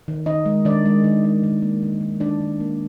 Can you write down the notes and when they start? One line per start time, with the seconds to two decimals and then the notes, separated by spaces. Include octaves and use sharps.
0.08 D#3
0.26 D#3 D#4 D#5
0.46 G#3
0.65 D#3 D4 D5
0.86 G#3
1.04 D#3
1.24 G#3
1.43 D#3
1.62 A#3
1.83 D#3
2.01 D#3
2.20 D#3 D4 D5
2.40 D#3
2.60 A#3